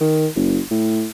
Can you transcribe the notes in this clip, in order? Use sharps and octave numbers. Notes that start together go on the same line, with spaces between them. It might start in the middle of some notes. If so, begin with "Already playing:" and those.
D#3
F#1
A2